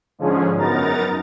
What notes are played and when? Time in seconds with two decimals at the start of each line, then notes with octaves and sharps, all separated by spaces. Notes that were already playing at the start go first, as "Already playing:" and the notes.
0.19 G#2 D3 F3 G#3 C#4 G#4
0.56 F#2 B3 D#4 A#4 A#5 A6